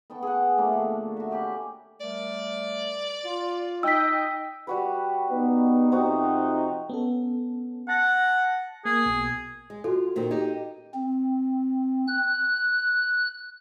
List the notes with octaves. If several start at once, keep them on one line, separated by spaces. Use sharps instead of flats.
B3 G5 A5 C#6
G#4 F#5
F3 A3 A#3 D4
D3
F#4 E5
C#4 G4 G#5 B5
G3 A3 A#4 D5
F4
D#4 D#5 G5 E6 B6
G3 F#4 B4
B3 D#4
F2 C3 C4 D#4 F#4
B3 C#4 A4
F#5 A5 A6 A#6
A#3 G#4
B1 B2
G#3
F4 F#4 A4
A#2 D#3 C4
D#4 G4
C4
F#6